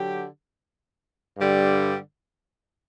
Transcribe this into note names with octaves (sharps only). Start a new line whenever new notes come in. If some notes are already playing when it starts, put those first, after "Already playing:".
Already playing: D3 F#3 G4
G2 D3 G3